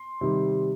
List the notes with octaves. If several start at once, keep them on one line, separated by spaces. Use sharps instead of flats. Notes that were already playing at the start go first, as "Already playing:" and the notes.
Already playing: C6
C3 D#3 G3